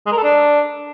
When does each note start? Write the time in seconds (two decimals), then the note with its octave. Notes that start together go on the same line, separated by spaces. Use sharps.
0.06 G#3
0.12 A#4
0.18 A4
0.23 D4